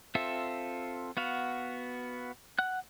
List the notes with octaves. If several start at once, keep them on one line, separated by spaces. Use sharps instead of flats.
C4 F4 A4 E5
B3 F#4 F5
F#5 F#6